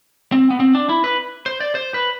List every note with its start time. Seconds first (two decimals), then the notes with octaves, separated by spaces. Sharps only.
0.32 C4
0.50 B3
0.60 C4
0.75 D4
0.89 E4
1.04 B4
1.46 C5
1.60 D5
1.75 C5
1.94 B4